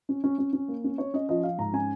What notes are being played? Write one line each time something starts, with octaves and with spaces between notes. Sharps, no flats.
C#4
C#4
C#4
C#4
A#3
C#4
C#4 C#5
C#4 D#5
F3 D#5
F3 F5
G#2 A#5
C#4 G#5